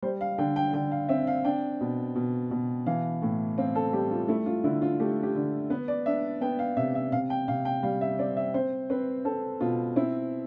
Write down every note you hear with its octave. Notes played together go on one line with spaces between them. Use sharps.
G3 C5
F5
D3 G5
G5
D3 G5
F5
C4 E5
F5
D4 G5
B2
B2
B2
E3 F5
A2
C4 F5
A4
G3 G4
F4
A3 E4
F4
D3 E4
F4
A3 G4
G4
D3
B3 B4
D5
D4 E5
B3 G5
F5
C3 E5
E5
C3 F5
G5
C3 F5
G5
G3 F5
E5
C4 D5
E5
C4 C5
C4 B4
C4 A4
B2 F4
C4 E4